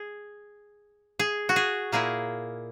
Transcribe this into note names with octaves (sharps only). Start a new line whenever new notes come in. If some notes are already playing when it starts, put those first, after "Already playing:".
Already playing: G#4
G#4
F#4
G#4
A#2 A#3 E4 G#4